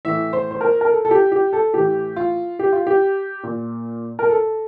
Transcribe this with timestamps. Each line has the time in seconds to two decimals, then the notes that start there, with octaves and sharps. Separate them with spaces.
0.05 A2 E3 E5
0.33 C5
0.51 C5
0.61 A#4
0.81 A#4
0.90 A4
1.05 A4
1.11 G4
1.32 G4
1.53 A4
1.74 A2 E3 G4
2.16 F4
2.59 G4
2.73 F4
2.87 G4
3.44 A#2
4.19 A#4
4.29 A4